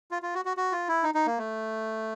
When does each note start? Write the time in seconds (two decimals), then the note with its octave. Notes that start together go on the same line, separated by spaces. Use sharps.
0.11 F4
0.22 F4
0.35 F#4
0.45 F#4
0.57 F#4
0.72 F4
0.89 E4
1.03 D#4
1.14 D#4
1.27 A#3
1.38 A3